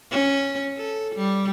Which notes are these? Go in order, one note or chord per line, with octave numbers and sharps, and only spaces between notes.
C#4
A4
G3